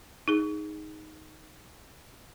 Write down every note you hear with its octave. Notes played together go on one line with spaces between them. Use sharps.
D#4 G#4